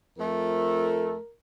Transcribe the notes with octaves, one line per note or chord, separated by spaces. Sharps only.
F2 F3 A3 A#4